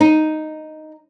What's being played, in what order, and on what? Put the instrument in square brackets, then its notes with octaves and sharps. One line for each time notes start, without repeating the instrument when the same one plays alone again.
[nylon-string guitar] D#4